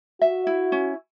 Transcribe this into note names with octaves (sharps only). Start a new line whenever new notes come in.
F#4 E5
E4
C#4